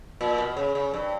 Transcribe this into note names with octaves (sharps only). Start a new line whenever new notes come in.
A#2
B2
C#3
C#3
G2